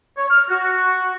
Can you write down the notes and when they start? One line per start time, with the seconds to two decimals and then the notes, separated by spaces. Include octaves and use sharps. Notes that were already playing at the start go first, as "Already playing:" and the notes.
0.17 C#5
0.30 F6
0.49 F#4